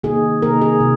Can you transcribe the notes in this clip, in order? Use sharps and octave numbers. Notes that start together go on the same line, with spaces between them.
C3 D#3 A#3 D#4 G#4
C3 D#3 A#3 D#4 A#4
G#4
C3